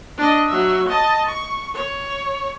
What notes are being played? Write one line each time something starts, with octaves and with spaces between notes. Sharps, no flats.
D4 D#5
F#3 E5
D#5 A5
C#6
C#5